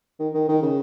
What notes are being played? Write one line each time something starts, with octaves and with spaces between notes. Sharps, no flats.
D#3
D#3
D#3
C#3